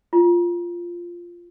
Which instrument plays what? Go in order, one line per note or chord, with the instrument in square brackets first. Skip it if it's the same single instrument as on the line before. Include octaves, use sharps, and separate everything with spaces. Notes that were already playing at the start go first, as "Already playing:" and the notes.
[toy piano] F4